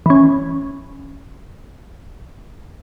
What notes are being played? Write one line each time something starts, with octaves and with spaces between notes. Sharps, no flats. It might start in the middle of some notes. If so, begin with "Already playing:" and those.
E3 C#4